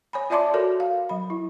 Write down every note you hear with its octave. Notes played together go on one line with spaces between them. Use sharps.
C#5 G#5 B5
F4 D5 E5 A5 C6 D6
F#4 A4 A#4 C#5
F5
F#3 B5
E4